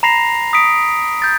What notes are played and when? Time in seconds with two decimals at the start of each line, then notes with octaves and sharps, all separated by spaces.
0.03 A#5 B5 A#6 C7 F7
0.53 D#6 B6 D7
1.22 G6 A6